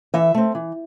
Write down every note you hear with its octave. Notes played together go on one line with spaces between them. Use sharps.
E3 E5
A3 C4
E3